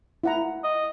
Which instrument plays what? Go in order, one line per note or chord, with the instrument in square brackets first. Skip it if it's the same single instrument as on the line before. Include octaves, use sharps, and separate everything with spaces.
[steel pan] E4 F#5 A#5
[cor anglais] D#5